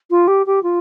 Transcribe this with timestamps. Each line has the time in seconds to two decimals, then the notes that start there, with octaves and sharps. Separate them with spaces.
0.10 F4
0.27 G4
0.46 G4
0.63 F4